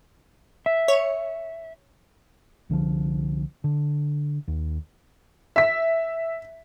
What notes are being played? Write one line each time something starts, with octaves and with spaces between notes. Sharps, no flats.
E5
C#5
C2 D3 D#3 F3
D3
D#2
E5 B6